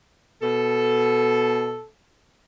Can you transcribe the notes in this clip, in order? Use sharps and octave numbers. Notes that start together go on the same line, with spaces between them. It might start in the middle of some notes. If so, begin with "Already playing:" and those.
B2 A4